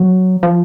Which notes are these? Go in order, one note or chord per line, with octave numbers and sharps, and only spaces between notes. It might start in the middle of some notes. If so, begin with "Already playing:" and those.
Already playing: F#3
F3